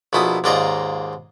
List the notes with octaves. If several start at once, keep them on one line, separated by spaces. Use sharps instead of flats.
A#1 B2 E4 A4 D#6
D#2 G#2 F4 D5 D#5 A#5